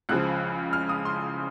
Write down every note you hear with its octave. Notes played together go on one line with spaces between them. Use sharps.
C#2 C#3 F3 F#6
F6
D#6
C6